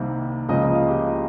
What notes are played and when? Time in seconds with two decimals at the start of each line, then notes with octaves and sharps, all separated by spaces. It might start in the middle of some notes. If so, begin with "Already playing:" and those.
Already playing: C2 C3 D#3 G3 A#3
0.49 C#2 C#3 F3 A#3 D#5
0.62 D#5
0.75 F5
0.88 G4